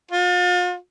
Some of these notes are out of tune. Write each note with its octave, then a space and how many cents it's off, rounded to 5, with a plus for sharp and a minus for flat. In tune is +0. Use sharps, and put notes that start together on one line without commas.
F4 +40